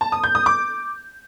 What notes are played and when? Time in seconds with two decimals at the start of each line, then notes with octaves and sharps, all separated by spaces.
0.01 A5
0.12 D#6
0.24 G6
0.35 D#6
0.46 D6